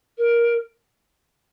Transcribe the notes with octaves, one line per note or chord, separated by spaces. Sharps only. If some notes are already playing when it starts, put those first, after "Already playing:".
A#4